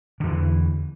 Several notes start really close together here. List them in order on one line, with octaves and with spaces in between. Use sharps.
D3 E2 F3 E3